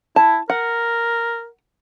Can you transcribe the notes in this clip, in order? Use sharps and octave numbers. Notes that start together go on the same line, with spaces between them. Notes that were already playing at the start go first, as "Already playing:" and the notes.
E4 A5
A#4 F#5